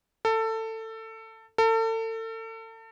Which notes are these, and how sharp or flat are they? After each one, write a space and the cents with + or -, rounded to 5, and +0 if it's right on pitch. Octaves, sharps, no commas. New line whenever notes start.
A4 +20
A4 +35